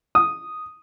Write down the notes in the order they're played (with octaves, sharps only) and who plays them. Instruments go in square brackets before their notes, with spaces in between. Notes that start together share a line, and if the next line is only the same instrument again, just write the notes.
[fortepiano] D#6